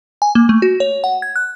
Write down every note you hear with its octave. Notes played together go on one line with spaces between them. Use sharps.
G#5
A#3
A3
F#4
C#5
F#5
G#6
F#6